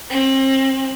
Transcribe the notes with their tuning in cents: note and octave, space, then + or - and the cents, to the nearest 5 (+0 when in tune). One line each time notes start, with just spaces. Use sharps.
C4 +35